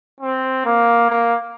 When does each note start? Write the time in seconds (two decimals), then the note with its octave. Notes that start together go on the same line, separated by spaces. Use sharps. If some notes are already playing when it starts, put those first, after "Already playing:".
0.21 C4
0.65 A#3
1.10 A#3